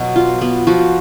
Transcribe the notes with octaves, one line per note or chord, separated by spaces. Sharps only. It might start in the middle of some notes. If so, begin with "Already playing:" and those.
Already playing: B2 F#3
F4
B3
F3 F#4